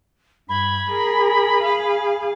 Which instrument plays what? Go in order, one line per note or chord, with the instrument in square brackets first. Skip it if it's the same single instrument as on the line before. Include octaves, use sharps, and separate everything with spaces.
[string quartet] G2 G#6 [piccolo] B5
[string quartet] G#4 A#4
G#4 F5